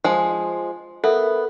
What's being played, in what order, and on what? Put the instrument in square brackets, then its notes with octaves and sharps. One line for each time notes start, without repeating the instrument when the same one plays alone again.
[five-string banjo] F3 G#3
[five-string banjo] B3 [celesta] A4 A#4 E5